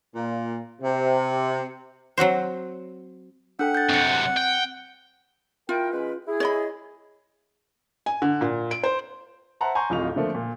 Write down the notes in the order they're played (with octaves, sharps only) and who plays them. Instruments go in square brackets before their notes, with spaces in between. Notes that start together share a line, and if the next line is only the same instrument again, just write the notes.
[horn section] A#2
C3
[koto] F#3 C4 F#4 C5
[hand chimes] D4 A4 G5 [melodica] F#5
[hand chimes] G6 A6
[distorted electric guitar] F#2 C3 [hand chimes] C4 C#7
[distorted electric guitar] G5
[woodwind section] E4 A#4 G5 [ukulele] F4
[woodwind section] G#3 C#4 B4
E4 G#4
[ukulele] C#5 D#5 B5
[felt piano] G#5
D3
A#2
D7
C5
[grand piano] C5 E5 F#5 A5 A#5 C6
G#5 A#5 C6 C#6 G6
D1 F2 F4 D#5 C#6 F7
D3 F3 A3 A#3
A#2